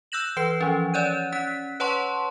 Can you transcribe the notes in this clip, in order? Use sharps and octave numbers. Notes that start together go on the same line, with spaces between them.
E6 F#6 G6 A#6 E7 F#7
E3 B4 C7
E3 F3 C#4
C#4 C#5 D5 F#6 G6 D#7
C#4 F#6 B6
B4 C#5 F#5 A5 C6 C#6